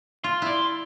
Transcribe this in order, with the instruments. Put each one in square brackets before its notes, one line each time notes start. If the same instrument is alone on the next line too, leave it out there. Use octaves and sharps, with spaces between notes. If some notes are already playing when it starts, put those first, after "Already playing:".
[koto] F4 [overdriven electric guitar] C6
[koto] E4 D5